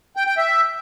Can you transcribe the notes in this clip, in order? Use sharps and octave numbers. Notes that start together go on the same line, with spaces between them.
G5
G5
E5